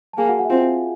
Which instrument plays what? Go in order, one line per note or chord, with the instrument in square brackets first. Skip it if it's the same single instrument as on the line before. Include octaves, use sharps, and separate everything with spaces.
[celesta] A5
[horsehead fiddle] A#3 [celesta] G#4 G#5
[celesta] F#4 F#5
F#4 F#5
E5
[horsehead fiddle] C4 [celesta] F4 F5